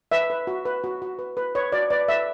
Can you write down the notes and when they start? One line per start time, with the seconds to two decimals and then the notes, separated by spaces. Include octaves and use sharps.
0.12 B4 E5
0.30 B4
0.47 F#4
0.65 B4
0.84 F#4
1.02 F#4
1.19 B4
1.37 B4
1.55 B4 C#5
1.72 F#4 D5
1.90 B4 D5
2.08 B4 E5